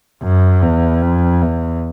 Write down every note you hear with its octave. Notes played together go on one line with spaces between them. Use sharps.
F#2
E2
F2
E2